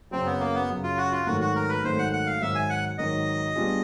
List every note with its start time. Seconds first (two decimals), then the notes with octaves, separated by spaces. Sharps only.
0.11 F#2 C#3 F#3 C4
0.26 B3
0.40 A#3
0.55 B3
0.68 F#2 C#3 F#3
0.83 F4
0.98 F#4
1.12 F4
1.26 G#2 D#3 F#3 A3 F#4
1.41 F#4
1.56 A#4
1.69 B4
1.83 G#2 D#3 F#3 A3 C5
1.99 F#5
2.13 F#5
2.27 F5
2.41 G#2 D#3 F#3 E5
2.55 G#5
2.70 F#5
2.98 G#2 D#3 F#3 D#5
3.56 G3 B3 D4 F4 G#4